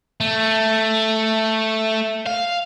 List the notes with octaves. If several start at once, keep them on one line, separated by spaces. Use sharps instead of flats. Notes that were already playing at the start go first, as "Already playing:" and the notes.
A3
F5